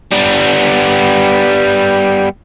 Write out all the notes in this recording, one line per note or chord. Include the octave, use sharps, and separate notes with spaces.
G3 B3